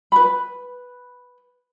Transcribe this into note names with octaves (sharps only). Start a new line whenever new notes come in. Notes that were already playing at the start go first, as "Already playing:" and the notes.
B4 B5